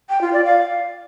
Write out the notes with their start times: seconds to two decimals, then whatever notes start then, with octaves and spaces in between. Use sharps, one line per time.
0.09 G5
0.21 F4
0.33 D5
0.45 F5